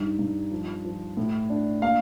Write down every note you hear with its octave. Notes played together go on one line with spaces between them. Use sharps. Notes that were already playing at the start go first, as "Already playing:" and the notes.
Already playing: G2 D#4
G2
F3
F3
A2
D4
A#3 F5